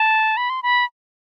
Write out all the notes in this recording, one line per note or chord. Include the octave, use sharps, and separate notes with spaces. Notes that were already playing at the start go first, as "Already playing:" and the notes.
Already playing: A5
B5
C6
B5